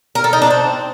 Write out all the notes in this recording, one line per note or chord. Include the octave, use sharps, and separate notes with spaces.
A#4
A4
D#4
D4
C4